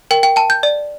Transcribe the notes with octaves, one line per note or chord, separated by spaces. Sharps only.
A#4 G5
G5
G5 A5
G6
D5